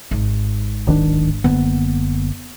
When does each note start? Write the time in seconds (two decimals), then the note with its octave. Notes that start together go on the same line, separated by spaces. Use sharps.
0.11 G#1 G#2
0.87 D1 D#3 D4
1.44 F#1 D3 A#3 B3